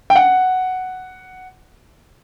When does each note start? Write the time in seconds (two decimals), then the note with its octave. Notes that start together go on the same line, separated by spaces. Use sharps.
0.10 G5
0.16 F#5